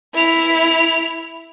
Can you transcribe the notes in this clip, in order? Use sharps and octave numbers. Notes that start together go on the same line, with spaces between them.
E4 F7